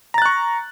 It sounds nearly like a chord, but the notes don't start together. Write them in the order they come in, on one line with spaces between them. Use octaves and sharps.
A#5 A6 F#6 C#6